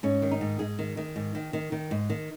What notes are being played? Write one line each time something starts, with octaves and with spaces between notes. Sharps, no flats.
G#2 C#4
D#3
D#4
G#2
G#2 G#4
D#3
D#3
G#2
D#3
D#3
D#3
G#2
D#3